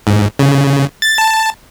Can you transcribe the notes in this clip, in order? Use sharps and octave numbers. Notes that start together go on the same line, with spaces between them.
G#2
C#3
A6
A5